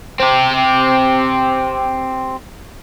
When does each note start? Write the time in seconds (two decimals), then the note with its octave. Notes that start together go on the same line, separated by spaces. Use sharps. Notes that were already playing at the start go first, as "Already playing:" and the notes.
0.20 C4 G4